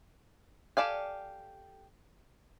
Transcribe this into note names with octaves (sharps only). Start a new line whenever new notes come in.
G4 A4 D5 F5 G#5